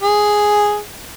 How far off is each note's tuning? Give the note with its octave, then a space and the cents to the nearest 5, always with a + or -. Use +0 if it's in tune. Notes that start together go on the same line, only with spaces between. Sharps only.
G#4 +0